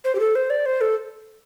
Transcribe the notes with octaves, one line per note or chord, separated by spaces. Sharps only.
C5
G4
A4
C5
D5
C5
A4